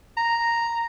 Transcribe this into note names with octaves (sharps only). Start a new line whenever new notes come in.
A#5